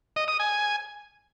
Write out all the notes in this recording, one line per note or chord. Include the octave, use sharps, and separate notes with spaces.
D#5
D#6
G#5